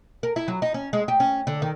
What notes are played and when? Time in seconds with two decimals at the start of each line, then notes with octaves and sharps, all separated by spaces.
0.23 A#4
0.36 E4
0.48 F#3
0.62 D#4
0.74 C#4
0.93 G#3
1.08 G4
1.20 C#4
1.47 D3
1.62 D#3